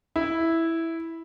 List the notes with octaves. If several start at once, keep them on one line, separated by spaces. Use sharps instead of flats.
E4